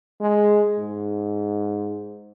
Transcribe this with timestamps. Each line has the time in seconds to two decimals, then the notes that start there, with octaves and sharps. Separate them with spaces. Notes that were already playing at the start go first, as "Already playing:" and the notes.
0.21 G#3
0.78 G#2